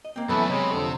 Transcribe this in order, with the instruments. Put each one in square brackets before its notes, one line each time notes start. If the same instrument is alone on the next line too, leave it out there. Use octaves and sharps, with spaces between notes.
[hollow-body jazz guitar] D#5
A#3 C4
[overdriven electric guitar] F#2 A3 [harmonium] E3 A4 [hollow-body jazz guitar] F#3 B3 [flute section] B5
[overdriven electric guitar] C3 [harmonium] G#3 C#5 D#5
[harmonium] F2 D3 A4